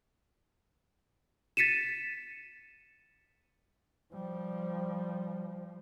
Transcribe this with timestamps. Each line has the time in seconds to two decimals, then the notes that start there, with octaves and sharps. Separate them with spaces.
1.57 A6 B6 C#7 D#7 E7
4.13 F3 G3